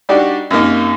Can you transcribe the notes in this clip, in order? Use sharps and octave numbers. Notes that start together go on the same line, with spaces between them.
G3 D4 D#4 F#4 G4
F#2 C3 A#3 D#4